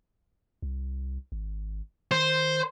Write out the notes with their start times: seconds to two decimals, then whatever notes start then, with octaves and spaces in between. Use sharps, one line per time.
0.62 C2
1.32 G#1
2.11 D#3 C5